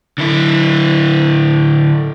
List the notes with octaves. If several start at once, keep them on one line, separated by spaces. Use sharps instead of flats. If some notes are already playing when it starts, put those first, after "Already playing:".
D3 E4